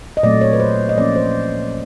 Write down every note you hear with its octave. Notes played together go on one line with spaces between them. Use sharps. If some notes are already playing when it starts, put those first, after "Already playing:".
D#5
A#2 F#3 A3 C4 D5
C#5
B4
C5
D#5
F3 A#3 C#4 D5
C5